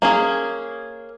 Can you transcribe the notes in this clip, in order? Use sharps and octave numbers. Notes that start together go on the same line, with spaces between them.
A#3 C#4 G#4